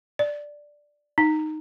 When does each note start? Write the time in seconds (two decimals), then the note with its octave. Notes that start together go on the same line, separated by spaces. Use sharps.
0.19 D5
1.18 D#4